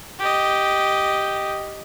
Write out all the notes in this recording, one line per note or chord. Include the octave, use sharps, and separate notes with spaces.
G4 D#5